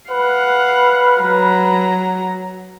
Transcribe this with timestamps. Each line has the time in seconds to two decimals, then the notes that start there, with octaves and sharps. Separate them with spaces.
0.11 B4 F5 F#5
1.21 F#3 A#5